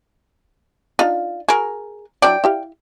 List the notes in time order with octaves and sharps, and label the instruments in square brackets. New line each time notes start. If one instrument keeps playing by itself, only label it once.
[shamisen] D4 D#4 [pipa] F4
[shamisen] F#4 [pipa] G#4 A#4
[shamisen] F#3 D4 E4 [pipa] D5 G5
[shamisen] E4 G4 F5